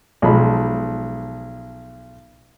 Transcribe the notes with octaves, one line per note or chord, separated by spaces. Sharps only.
B1 F3 G#3 B5